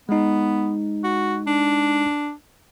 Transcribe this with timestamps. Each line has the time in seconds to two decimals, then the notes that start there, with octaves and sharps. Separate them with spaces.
0.09 G#3 B3 D#4
1.04 F#4
1.47 D4